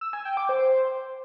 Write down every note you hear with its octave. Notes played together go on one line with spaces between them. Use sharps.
E6
G#5
G5
D6
C5